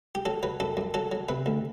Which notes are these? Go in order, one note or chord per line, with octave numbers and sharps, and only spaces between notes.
G4
F#3 A4
F#3 B4
F#2 A4
F#2
F#3 A4
F#3
C3 B4
D2